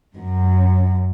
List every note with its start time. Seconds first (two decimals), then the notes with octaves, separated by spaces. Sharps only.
0.16 F#2